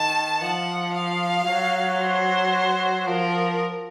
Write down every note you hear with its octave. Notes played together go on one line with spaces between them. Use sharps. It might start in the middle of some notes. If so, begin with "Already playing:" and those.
Already playing: D#3 A5
F3 F#5
F5
F#3
C5
F3 A#4